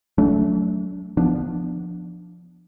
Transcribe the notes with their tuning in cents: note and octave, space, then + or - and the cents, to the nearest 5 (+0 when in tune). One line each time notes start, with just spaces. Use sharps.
F#3 +0 A3 -5 D4 -40
F3 +0 B3 +0 D4 +10